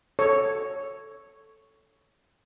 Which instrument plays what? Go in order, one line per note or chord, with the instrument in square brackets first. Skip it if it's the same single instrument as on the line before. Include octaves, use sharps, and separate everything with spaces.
[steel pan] A4 C#5